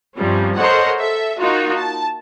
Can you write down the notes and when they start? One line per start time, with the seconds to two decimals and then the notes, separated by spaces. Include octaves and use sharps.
0.17 G2 C3 F3 G3 C#4
0.57 A4 A#4 C5 C#5 D#5 F#5
0.99 A4 E5
1.40 A#3 D#4 F4 F#4
1.79 A5